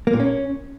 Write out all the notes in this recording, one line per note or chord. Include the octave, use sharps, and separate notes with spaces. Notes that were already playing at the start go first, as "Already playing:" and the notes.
A#3
A#2
C#4